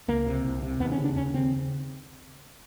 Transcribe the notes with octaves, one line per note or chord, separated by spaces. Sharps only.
C#2 A#3
C3
C2
C3
D#2 B3
C#4
C#3
D4
D#2 C#4
C#3 C4